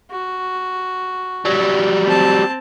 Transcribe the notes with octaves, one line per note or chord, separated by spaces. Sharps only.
F#4
F#3 G3
C4 A5